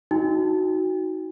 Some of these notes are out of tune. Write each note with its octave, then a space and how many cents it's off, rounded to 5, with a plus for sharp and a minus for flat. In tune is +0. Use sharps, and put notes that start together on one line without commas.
D#4 +25 F#4 +0 G5 +45